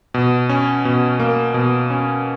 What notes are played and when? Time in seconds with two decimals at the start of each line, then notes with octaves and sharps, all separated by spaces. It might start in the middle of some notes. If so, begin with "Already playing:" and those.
0.14 B2
0.49 C#4
0.85 B2
1.20 A#3
1.54 B2
1.90 C#4